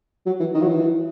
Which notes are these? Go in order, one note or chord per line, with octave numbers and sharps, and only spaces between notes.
F#3
E3
D#3
F#3
E3